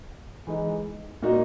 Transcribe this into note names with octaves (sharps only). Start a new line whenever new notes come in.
E3 G#3 D#4
A#2 A#3 D#4 F#4